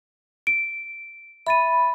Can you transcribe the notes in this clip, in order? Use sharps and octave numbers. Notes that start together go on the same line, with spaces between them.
D7
E5 B5 A6 D#7